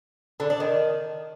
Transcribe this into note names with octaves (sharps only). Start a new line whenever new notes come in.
D3
D4
D#3